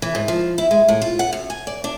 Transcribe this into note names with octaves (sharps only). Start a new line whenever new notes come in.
E3
G#2
F3
E4
G#3
A2
F4
F#5
F#2
G#5
D5
D4